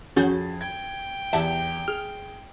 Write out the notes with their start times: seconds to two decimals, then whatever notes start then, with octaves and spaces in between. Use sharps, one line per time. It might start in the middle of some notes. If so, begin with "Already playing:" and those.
0.16 F2 C#4 F#4 G#4 G6 A6
0.61 G5 G#6
1.33 E2 G4 E5 F#5 A5
1.88 G#4 F6